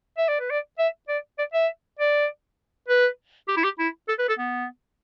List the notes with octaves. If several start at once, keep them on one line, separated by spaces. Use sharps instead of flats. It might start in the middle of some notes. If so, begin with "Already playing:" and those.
E5
D5
B4
D5
E5
D5
D5
E5
D5
B4
G4
E4
G4
E4
A4
B4
A4
B3